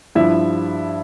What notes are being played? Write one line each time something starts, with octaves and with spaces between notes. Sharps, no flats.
G2 F3 E4 E5